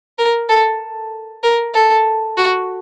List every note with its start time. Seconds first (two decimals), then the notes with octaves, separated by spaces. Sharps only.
0.18 A#4
0.49 A4
1.43 A#4
1.74 A4
2.37 F#4